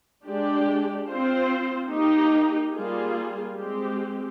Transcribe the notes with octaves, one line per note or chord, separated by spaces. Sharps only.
G#3 D4 G4 D5
C4 F4 C5
A#3 D#4 G4
G3 A#3 F4 G#4
G#3 C4 G4